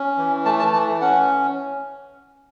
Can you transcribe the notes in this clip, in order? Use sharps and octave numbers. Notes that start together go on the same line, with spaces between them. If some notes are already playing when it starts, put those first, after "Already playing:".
Already playing: C#4
E3
A3 A5
A5
E3 A5
C#4 F#5